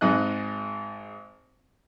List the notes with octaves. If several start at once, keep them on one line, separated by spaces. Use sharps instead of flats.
G#1 G#2 D#4 D#5 F#6